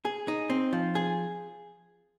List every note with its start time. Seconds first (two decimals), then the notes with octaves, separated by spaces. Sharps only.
0.05 G#4
0.28 D#4
0.50 C4
0.73 F3
0.95 G#4